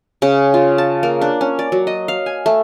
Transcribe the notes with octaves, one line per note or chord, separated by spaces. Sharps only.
C#3
F4
A5
A#3
D4
C#4
D5
F#3
D#5
F5
G#5
A3